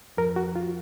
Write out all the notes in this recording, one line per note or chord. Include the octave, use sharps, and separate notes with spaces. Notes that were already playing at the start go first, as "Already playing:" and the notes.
F2 F3 A#4
F#4
F4